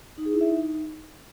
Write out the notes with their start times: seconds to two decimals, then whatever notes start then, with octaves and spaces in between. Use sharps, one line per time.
0.18 D#4
0.25 G#4
0.33 E4
0.41 E5
0.49 D#4